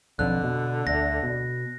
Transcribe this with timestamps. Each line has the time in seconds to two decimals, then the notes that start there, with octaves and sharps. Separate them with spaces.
0.19 B1 F2 D3 F#6
0.44 B2
0.87 D2 A#6
1.23 B2